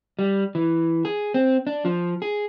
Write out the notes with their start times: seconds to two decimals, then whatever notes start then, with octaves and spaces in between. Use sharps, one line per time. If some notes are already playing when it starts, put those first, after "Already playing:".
0.19 G3
0.55 E3
1.05 G#4
1.34 C4
1.67 D4
1.85 F3
2.22 G#4